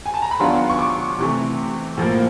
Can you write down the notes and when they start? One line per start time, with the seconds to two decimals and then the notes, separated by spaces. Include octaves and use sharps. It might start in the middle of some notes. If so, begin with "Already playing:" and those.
0.06 G#5
0.14 A5
0.22 A#5
0.31 B5
0.40 D#3 F#3 B3 D4 F4 C6
0.70 C#6
0.79 D6
1.18 C3 E3 A3
1.98 A2 F3 A#3